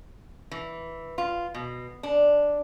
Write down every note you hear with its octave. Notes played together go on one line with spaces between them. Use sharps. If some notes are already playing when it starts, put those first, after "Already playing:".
E3
F4
B2
D4